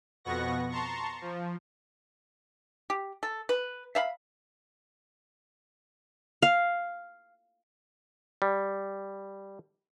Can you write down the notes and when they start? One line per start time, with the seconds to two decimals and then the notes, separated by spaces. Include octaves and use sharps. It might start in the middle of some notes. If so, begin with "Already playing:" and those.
0.24 F2 B2 B3 F#5 C#6 A#6
0.71 A5 A#5 C6 C#6
1.22 F3
2.90 G4
3.23 A4
3.49 B4
3.95 E5 F5 B5
6.42 F5
8.42 G3